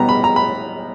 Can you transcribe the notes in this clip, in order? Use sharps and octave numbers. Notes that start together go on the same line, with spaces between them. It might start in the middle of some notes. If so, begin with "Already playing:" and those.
Already playing: B2 G3 B3 A#5
B5
A#5
B5